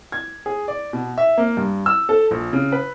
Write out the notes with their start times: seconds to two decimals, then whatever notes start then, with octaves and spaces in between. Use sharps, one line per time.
0.12 G#6
0.46 G#4
0.68 D5
0.93 B2
1.18 E5
1.38 A#3
1.57 G2
1.86 E6
2.09 A4
2.31 A#1
2.53 C#3
2.72 B4